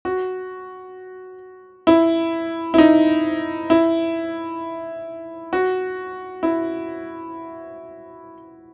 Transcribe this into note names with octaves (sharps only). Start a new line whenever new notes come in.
F#4
E4
E4
D#4
E4
F#4
E4